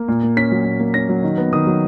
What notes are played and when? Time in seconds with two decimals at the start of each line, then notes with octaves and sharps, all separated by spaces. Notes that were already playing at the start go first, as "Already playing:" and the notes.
Already playing: A#3
0.08 A#2
0.23 A#3
0.37 C#4 B6
0.52 F#3
0.65 A#2
0.80 A#3
0.94 C#4 A#6
1.09 F#3
1.23 D#3
1.38 B3
1.53 D#3 D#6
1.67 F#3